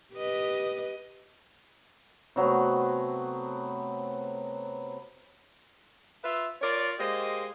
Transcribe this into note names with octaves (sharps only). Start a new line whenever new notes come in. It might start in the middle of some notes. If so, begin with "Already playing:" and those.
G4 B4 D#5
C3 F#3 A3 B3
F4 B4 E5
F4 A#4 C#5 D5
G#3 A#3 G4 C5 D#5